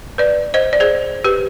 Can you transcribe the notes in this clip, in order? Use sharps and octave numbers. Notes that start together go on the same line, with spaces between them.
B4 D5
C5 D#5
D5
G#4 C5
G4 B4